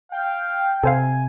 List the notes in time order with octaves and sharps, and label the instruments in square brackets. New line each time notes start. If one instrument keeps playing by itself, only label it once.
[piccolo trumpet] F5 [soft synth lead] G5
[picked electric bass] C3 [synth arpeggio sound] A4 C5 F5 [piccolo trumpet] G#5